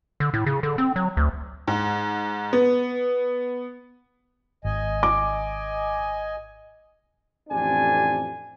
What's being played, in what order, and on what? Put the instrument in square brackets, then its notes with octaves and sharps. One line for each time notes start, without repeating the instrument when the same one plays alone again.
[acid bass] D3
A2
C#3
D3
C4
F#3
D2
[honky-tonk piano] G#2
B3
[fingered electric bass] G#1 [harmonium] D#5 G#5
[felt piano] D6
[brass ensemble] A1 F2 C4 D4 G4 G#5